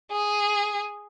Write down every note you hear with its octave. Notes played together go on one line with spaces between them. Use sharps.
G#4